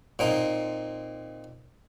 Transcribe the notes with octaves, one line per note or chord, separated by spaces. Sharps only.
A#2 C4 D#4